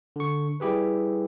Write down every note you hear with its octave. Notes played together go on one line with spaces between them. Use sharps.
D3 C#6
G3 E4 G4 G#4 B4